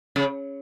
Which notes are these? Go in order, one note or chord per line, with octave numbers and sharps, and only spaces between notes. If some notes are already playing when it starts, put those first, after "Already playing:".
C#3